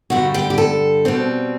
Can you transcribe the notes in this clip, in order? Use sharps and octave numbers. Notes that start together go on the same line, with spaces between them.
G2 D3 G3 F#4
G4
G4
A4
B2 G3 C4